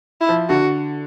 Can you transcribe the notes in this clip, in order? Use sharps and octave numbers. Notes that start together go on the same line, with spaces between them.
E4
F3
D3 F#4